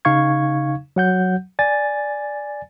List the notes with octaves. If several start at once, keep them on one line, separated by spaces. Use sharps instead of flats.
C#3 D#4 F5 C#6 G#6
F#3 F#5 G6
D5 G#5 A6